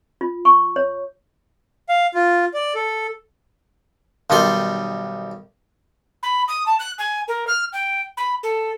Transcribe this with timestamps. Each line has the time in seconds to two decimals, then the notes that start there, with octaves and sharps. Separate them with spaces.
0.21 F4
0.45 C#6
0.76 C#5
1.89 F5
2.14 F4
2.54 D5
2.75 A4
4.30 B1 D#3 G3 A4 C6
6.23 B5
6.48 D#6
6.66 A5
6.79 F#6
6.98 G#5
7.28 A#4
7.47 F6
7.73 G5
8.17 B5
8.43 A4